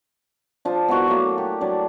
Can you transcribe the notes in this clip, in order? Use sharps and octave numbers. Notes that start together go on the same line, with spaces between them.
F3 D4
B3 E4 F#4 A#4
F#3 A3 A#3
G4
F#3 D4 D5